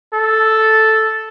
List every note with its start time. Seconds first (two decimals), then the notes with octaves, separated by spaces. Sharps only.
0.14 A4